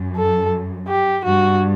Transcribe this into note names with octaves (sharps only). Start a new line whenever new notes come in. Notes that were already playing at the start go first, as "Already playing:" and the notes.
Already playing: F#2
A4
G4
G2 F#4